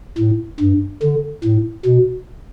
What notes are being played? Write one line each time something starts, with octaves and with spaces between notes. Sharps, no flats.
A2
G2
D3
A2
B2